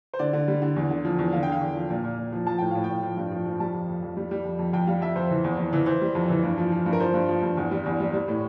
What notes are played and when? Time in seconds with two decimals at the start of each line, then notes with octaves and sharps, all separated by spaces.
0.14 C5
0.19 D3 D5
0.33 D3
0.48 G3
0.62 D3
0.76 E2
0.91 D3
1.05 F3
1.19 E2
1.33 D3 F5
1.43 D3 G5
1.52 F5
1.61 E2
1.76 F3
1.90 A#2
2.04 A#2
2.18 A#2
2.32 F3
2.46 F3 A5
2.58 A2 G5
2.71 A2 F5
2.84 G5
2.89 A2
3.03 F3
3.17 G2
3.31 F3
3.46 F3
3.60 G3 A5
3.74 F2
3.88 F2
4.03 F2
4.17 G3
4.31 G3
4.45 F2
4.59 F2
4.73 F2 G5
4.87 G3 F5
5.01 F2 E5
5.16 F2 C5
5.31 E3
5.44 E2
5.58 E2
5.73 E3
5.86 E3 C5
6.02 G3
6.15 F2
6.29 E3
6.44 G2
6.58 F3
6.72 F3
6.86 G2
6.93 A#4
7.00 F3 C5
7.14 G2
7.29 F3
7.43 G2
7.57 E2
7.71 G3
7.86 E2
8.00 G3
8.14 G3
8.28 A2